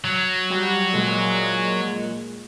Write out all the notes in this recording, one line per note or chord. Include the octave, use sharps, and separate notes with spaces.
F#3
G3 F#4
A#2 G#3